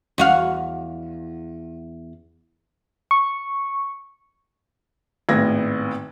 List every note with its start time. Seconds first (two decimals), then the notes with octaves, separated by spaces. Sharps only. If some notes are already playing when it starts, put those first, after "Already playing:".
0.18 E2 F#4 F5
3.11 C#6
5.29 G#1 A2 B3 G#6 A#6